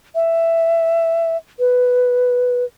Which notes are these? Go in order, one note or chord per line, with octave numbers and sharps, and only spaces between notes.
E5
B4